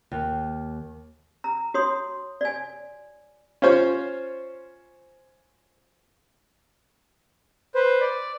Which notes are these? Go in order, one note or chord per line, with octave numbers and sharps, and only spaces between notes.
D#2
A#5
F#4 C#5 C6 D#6
D5 G#5
C#4 F4 C5 C#5
B4 C5
D5